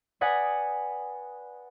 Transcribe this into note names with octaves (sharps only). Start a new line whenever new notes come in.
B4 D5 F#5 G#5 D#6